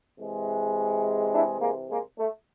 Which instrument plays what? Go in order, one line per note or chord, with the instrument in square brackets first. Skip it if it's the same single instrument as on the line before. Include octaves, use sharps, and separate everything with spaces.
[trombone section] C3 E3 G#3
D4 E4
G#3 A#3
G#3 A#3
A3